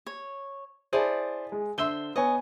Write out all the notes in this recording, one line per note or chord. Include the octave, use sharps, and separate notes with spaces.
C#5
E4 G#4 C5 D5 A5
G#3
D3 C5 E5 C6 G7
B3 C#5 D#5 G#5